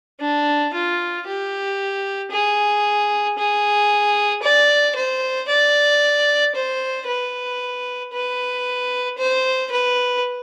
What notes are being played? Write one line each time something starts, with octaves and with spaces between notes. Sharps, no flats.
D4
F4
G4
G#4
G#4
D5
C5
D5
C5
B4
B4
C5
B4